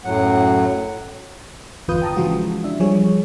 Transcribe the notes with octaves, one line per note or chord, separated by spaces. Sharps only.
F#2 A2 F#3 F#5
G1 E2 F4 B4 D#6 G6
G5 A5 A#5 D#6
C#3 E3 F3 G#3 F4 F#4
D4 E5
F3 G3 G#4 C#5